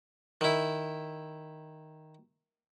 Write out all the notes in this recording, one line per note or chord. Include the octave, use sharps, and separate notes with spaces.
D#3 E4